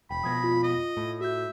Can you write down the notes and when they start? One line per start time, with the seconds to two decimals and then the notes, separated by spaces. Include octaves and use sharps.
0.10 E1 G5 B5
0.23 F2 B2 D#6 G#6 A#6
0.44 F4
0.63 D#5
0.97 A2
1.21 F#4 E5 G6